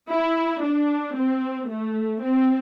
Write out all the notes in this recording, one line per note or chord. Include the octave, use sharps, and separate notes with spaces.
E4
D4
C4
A3
C4